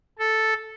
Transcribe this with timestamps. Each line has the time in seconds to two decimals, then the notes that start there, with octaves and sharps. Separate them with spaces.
0.19 A4